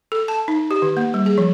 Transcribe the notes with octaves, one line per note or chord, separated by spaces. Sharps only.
A4
A5
D#4
G4
D#3
A#3
G3
G#4
F3